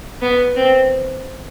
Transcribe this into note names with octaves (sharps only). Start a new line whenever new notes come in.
B3
C4